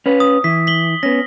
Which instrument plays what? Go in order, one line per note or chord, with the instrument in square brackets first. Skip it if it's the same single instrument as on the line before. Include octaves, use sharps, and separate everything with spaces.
[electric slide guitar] C#4 B4
[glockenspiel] D#6
[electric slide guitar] E3 [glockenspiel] B6
[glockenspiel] B6 F#7 G7
[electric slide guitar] B3 C#4 [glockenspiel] A#6